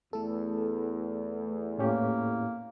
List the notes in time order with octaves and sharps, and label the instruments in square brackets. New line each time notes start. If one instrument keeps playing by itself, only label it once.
[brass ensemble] E2 [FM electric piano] A3 A4
[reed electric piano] A2 C#4 G4 [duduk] A#3